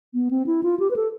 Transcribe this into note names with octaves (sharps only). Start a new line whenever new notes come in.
B3
C4
E4
F4
G4
B4
A4